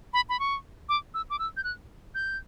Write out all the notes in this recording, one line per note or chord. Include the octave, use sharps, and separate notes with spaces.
B5
B5
C#6
D6
E6
D6
E6
G6
F#6
G6